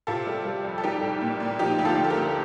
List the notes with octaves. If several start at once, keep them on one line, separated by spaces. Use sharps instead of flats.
C3 F4 A4
G3
G3
F2
A4
G3 D#4 G4
C2
A#2
A#2
F3 D#4 G4
D2
F4 A4
D2
A4
G4 A#4
D2